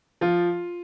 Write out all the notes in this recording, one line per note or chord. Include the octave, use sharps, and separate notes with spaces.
F3 F4